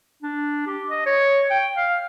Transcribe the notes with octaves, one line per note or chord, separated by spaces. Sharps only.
D4
G4
D#5
C#5
G5
F5